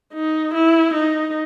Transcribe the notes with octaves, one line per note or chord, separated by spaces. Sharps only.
D#4
E4
D#4